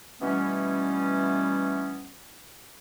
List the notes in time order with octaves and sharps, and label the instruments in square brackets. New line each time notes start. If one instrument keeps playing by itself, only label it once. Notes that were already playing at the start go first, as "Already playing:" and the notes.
[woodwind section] B2 E3 G3 A3 B3 C#4